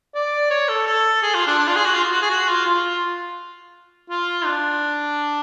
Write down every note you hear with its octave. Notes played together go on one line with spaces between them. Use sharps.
D5
C#5
A4
A4
G#4
F4
D4
D4
F4
G#4
F#4
F4
F#4
G#4
F#4
F4
F4
F4
D4